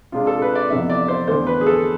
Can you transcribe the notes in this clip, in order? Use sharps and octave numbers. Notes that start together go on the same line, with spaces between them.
C3 G#3 D4 F4
A4
B4
D5
F2 C3 E3 B3 E5
D5
C5
E2 D3 A3 C5
B4
G#4
A4